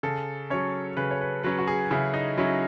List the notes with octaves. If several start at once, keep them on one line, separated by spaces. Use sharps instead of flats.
C#3 A4
F#3 C#4 C#5
C#3 B4
C#5
B4
F#3 C#4 B4
F#4
G#4
C#3 E4
D#4
F#3 C#4 E4